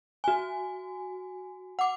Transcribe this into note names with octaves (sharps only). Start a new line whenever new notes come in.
F#4 G#5
F#5 D6